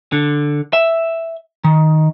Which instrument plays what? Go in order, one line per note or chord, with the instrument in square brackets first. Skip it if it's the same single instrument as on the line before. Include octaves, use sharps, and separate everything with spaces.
[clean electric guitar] D3
E5
D#3